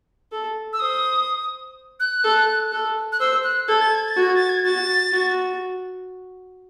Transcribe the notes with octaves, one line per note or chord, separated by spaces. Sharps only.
A4
E6
C5 D#6
F#6
A4
A4
F#6
C5 E6
F#6
A4 G#6
A6
G#6
A6
F#4
G#6
A6
G#6
F#4 A6
F#4